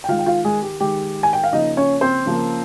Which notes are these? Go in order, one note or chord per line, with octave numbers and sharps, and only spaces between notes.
G5
D#3 G#3 F4 F5
G5
F4 F5
G#3 G#4
G4
D#3 G#3 G4
G#5
G5
F5
C#3 F3 A#3 D#4 D#5
C#4 C#5
C4 C5
C#3 F3 A#3